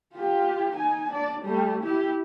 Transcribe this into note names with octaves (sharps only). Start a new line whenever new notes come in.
F4 G4
D#4 G#5
D4 D5
G3 A3
E4 G4